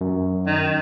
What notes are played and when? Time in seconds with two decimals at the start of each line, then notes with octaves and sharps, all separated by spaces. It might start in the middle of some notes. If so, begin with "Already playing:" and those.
0.01 F#2
0.47 D#3